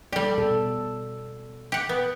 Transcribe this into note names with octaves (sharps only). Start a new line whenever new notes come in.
G3 G4 A4 D5
B2 A4
G4 F#5
B3